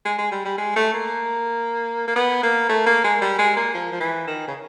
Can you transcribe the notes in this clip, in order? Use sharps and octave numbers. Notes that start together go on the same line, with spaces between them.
G#3
G#3
G3
G3
G#3
A3
A#3
A#3
B3
A#3
A3
A#3
G#3
G3
G#3
A#3
F3
F3
E3
D#3
C#3